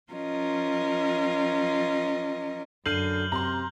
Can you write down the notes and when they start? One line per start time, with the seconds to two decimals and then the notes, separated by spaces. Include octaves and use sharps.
0.11 F3 C#4 F4 A#4 D#5
2.86 F#2 D3 F6 G6 C7 D#7 F#7
3.32 C3 A#5 C6